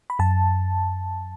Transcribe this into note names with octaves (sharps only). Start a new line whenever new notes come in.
B5
F#2 A5